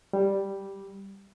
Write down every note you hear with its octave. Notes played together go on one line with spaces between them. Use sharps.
G3